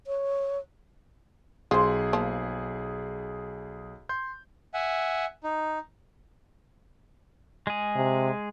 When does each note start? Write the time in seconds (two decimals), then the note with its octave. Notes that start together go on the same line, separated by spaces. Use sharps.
0.07 C#5
1.71 B1 F4 G#4 C5
2.13 F3 A#3 A5
4.09 C6 G6
4.74 E5 F#5 G#5
5.44 D#4
7.67 G#3 G#4
7.96 C3